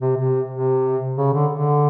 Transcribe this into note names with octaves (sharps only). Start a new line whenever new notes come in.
C3
C3
C3
C#3
D3
D3